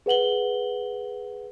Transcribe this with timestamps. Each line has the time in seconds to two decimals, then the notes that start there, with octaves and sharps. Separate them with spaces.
0.06 G#4 B4 F#5 F#7 G7